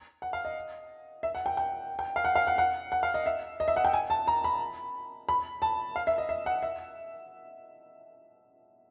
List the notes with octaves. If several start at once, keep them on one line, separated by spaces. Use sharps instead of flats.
F#5
F5
D#5
E5
F#5
G5
G5
G5
F5
F#5
F5
F#5
F#5
F#5
F5
D#5
E5
D#5
E5
F#5
G5
G#5
A5
A#5
B5
B5
A5
F5
E5
D#5
E5
F#5
E5